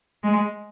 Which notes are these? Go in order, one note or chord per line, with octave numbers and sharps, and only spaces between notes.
G#3